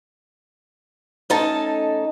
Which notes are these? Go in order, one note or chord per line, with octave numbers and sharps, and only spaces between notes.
A3 C#4 D#4 A4 A5